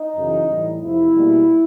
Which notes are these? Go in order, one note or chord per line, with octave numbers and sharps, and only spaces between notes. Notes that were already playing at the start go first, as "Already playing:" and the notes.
Already playing: D#4
F#2 C#3 E3
A2 E3 G3
F2 C3 F3 E4
B2 G3 A#3